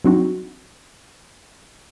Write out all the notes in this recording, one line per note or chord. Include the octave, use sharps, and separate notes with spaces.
F#3 G3 C4 D4 D#4 F#4